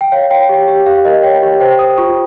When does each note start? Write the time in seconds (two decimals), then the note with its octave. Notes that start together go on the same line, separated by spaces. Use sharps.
0.01 G5
0.12 C#5 F5
0.30 C#5 G5
0.49 G4
0.68 G4
0.86 G4 F5
1.05 A#4 D#5
1.23 C#5 G5
1.43 G4
1.60 C5 G5
1.79 C5 D#6
1.98 F4 C#6